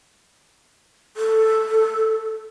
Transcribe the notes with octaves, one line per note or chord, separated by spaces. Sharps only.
A4